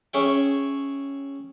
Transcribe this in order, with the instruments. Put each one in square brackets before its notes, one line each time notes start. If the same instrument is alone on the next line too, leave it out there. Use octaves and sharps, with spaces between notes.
[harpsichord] C#4 G#4 C#5 E5 G5